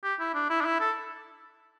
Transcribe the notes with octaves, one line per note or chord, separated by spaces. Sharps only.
G4
E4
D4
E4
D4
E4
A4